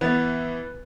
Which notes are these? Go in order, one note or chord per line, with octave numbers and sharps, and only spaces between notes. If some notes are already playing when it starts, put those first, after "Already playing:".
E3 B3 B4 A6